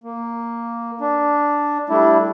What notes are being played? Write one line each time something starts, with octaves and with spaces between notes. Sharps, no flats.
A#3
D4
G3 A3 D4 E4